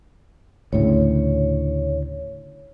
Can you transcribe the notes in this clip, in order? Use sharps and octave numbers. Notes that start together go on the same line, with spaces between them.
D2 A2 C#3 C#5